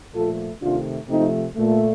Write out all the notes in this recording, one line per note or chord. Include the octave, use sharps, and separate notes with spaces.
A#2 F3 A3 F4 A4
C3 D#3 A3 D4 F4
C3 F3 A3 C4 D#4
A#2 A3